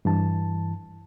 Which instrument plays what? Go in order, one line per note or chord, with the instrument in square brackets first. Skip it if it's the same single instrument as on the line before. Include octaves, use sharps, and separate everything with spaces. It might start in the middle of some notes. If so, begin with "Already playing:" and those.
[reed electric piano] G2 E3 A5